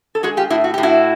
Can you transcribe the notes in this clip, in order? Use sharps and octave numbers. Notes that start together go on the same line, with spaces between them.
A4
G#3 F#4 G#4
F4 G4
A2 E4 F#4
F#4
A2 G4
E4 F#4